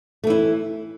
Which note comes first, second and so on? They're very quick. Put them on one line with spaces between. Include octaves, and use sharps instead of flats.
A3 E3 E4